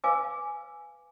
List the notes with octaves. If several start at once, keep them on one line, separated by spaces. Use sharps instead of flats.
B4 F5 G#5 D6 E6